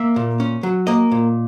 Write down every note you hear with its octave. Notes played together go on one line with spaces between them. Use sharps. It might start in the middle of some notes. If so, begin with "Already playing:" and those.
Already playing: A#3 E5
A#2
C#4
F#3
A#3 D#5
A#2